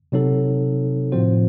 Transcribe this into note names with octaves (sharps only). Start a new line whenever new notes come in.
C3 F#3 C4 D#4 A4
A2 F3 C4 F#4 C5